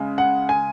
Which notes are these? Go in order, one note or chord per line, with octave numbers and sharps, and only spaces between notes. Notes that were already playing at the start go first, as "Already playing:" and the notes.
Already playing: C#3 G#3
F#5
G#5